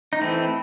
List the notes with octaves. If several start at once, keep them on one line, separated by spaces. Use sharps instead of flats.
D#4
E3 A3 C4 E4